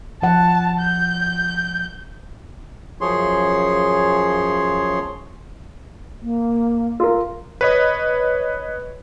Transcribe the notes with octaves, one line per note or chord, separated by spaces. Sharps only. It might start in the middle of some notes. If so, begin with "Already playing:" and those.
F3 F#5 A5
G6
F#2 C#3 F3 G#4 C#5 C6
A#3
F4 A#4
B4 C#5 D#5